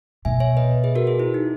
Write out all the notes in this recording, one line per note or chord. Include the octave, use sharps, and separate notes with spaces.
B2 E5 G#5
C#5 E5
B4 D#5
G#4 B4
F#4 A#4
G#4
E4
D#4